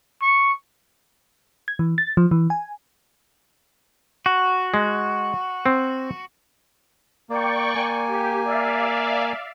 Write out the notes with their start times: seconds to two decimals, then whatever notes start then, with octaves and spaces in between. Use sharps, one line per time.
0.22 C#6
1.68 G#6
1.79 E3
1.98 A6
2.17 F3
2.31 E3
2.50 G#5
4.26 F#4
4.74 G#3
5.66 C4
7.30 A#3 D5 G5 C#6
7.76 A#3 G#5
8.08 G4
8.45 D5 E5 F5